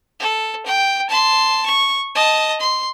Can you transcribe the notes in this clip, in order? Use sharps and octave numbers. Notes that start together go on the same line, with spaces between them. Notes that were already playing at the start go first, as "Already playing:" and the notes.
A4
G5
A5 C6
C#6
D#5 A5
C6